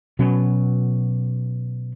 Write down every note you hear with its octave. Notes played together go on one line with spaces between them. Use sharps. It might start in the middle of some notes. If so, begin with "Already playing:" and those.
B2 F#3 C#4